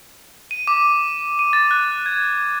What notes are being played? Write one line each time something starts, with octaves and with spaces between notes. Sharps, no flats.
D#7
D6
D#7
A6
F#6
G#6